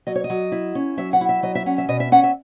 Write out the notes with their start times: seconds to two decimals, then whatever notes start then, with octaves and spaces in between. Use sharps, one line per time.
0.07 F#3 D#5
0.16 C#5
0.24 D#5
0.30 F#3
0.52 E4
0.75 C#4
0.97 F#3 E5
1.13 F#5
1.21 E4
1.29 E5
1.43 F#3 D#5
1.55 E5
1.66 C#4 F#5
1.78 E5
1.89 B2 D#5
2.00 E5
2.12 C#4 F#5
2.24 E5